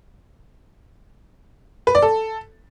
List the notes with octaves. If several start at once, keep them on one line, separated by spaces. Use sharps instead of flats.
B4
D5
A4